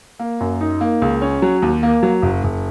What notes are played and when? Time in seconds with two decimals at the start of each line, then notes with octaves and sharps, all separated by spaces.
0.20 A#3
0.40 F#2
0.61 D#4
0.81 A#3
1.02 C#2
1.22 C#4
1.42 F#3
1.62 D#2
1.83 A#3
2.03 F#3
2.22 F#1
2.44 F#1